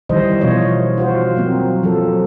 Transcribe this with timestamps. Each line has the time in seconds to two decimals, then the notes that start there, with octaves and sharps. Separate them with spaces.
0.09 D#3 E3 G3 C5 D#5
0.41 B2 F3 F4 C#5 D#5
0.98 F4 F#4 C5
1.37 F#3 A#3 C4
1.83 F3 F#3 A4